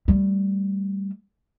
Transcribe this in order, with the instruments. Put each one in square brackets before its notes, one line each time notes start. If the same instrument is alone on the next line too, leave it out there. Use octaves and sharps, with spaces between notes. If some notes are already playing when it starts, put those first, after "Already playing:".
[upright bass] G3 A3